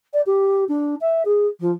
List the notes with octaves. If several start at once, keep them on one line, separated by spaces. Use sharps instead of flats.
D5
G4
D4
E5
G#4
F3